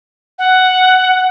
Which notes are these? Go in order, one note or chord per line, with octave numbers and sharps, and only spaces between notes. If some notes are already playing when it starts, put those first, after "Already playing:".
F#5